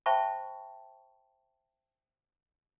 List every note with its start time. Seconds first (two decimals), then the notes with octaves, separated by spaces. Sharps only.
0.06 C5 E5 G5 A5 B5 C#6